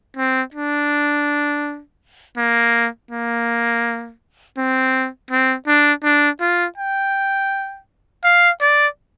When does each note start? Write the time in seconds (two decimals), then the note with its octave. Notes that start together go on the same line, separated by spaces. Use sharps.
0.17 C4
0.54 D4
2.37 A#3
3.11 A#3
4.57 C4
5.30 C4
5.67 D4
6.04 D4
6.41 F4
6.78 G5
8.24 F5
8.61 D5